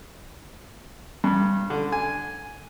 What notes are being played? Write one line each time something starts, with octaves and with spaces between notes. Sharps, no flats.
G2
D3
G#5